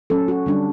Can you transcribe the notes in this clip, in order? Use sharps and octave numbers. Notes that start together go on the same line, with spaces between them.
F#3 C#4 A4
F#4
D3 G3 D4